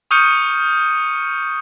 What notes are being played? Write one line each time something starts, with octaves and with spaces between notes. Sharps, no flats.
C#6 D#6 F6 G6 C#7 D#7